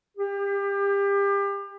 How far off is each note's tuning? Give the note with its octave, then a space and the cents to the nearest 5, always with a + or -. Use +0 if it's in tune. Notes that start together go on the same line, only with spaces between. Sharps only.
G4 +30